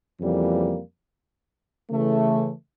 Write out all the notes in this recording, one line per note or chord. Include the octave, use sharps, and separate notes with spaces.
F2 C#3 E3 G3 A#3
C#3 E3 A3